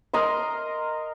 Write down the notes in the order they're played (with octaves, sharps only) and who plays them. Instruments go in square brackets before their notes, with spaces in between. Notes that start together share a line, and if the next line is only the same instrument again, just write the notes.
[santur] A#4 D#5 C6